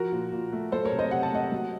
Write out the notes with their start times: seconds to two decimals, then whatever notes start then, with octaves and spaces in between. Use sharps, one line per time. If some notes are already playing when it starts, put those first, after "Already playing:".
Already playing: F3 F#4 A#4
0.12 A#2
0.32 A#2
0.53 A3
0.72 F#3 A4 C5
0.85 A#4 C#5
0.91 C3
0.99 C5 D#5
1.11 C3 F#5
1.23 A5
1.32 A3 D#5 F#5
1.52 F#3